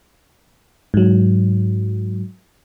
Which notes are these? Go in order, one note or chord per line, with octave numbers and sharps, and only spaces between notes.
G#2 F#3